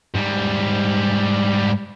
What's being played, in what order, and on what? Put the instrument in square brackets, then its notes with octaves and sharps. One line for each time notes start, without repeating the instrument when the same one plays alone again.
[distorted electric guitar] G#2 G3